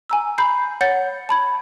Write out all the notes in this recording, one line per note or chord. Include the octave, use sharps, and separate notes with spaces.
G#5 A#5 E6
A#5 B5 G6 C7
C#5 F#5 G6 A6 C#7
A5 B5 G#6